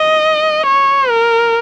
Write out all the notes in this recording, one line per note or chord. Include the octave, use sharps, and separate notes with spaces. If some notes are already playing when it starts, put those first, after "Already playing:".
Already playing: D#5
C#5
A#4